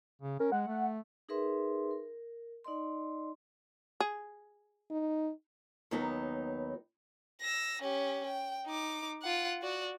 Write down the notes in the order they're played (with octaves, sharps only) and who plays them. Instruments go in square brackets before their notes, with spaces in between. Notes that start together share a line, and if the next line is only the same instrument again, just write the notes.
[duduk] C#3
[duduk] C#4 [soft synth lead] A#4
[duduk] G#3 [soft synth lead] F#5
[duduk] A3
[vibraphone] D#4 G#4 A#4 B4 E5 C6
A#4
D#4 D5 D#5 C6
[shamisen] G#4
[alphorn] D#4
[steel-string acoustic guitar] D#2 F#3 B3 D#4
[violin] E6 A#6
C#4 G4
G5
D#4 D6
F4 F#5
F#4 D5